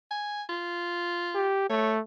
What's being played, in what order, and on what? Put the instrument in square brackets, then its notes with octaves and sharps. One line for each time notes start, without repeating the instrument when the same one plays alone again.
[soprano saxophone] G#5
F4
[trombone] G4
[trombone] A3 [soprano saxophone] C#5